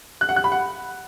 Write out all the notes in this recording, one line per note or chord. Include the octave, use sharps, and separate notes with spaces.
F#6
F#5
F#6
B5
F#5